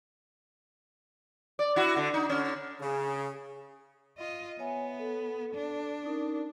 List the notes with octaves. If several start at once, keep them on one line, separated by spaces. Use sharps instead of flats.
D5
E4 F#4
D3
D#4
D3 C#4
C#3 G#4
F4 D#5
B3 C#5 E5 G#5
A4
D4
C#4 D#4 A#4